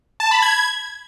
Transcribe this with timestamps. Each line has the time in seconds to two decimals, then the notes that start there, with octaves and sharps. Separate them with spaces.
0.20 A5
0.31 B5
0.42 G#6